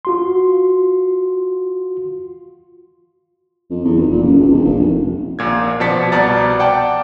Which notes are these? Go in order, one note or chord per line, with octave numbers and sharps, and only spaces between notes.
F4 F#4 C6
F2
E2
F1
A#2
F#1
C#2
E1
A#1
F1
A#1 A#2 G#6
B2 F3 D5 A5 B6 C#7
C2 B2 D5 A5 A#5 A6
D5 F#5 G5 A5